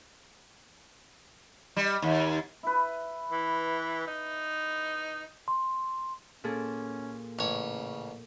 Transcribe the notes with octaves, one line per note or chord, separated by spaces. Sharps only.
G3
D#2
E4 B4
E3
D#4
C6
A#2 C#4 G#4 A4
A1 C#3 C#5